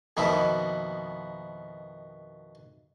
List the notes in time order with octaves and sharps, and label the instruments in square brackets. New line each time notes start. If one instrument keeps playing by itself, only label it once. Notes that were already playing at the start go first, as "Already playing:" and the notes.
[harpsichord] F2 B2 D#3 A#3 E4